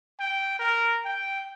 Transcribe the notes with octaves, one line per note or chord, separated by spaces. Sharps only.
G5
A#4
G5